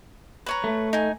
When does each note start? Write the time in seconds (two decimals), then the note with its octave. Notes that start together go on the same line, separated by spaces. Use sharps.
0.46 B4 C#5 A#5
0.64 A3
0.93 D#4 G#5